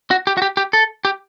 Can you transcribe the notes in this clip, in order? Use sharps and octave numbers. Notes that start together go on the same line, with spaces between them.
F#4
G4
F#4
G4
G4
A4
G4